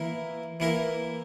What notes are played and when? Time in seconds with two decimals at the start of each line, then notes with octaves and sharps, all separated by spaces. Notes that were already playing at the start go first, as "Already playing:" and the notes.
Already playing: E3 A#3 E4 A#4
0.60 E3 A#3 E4 A#4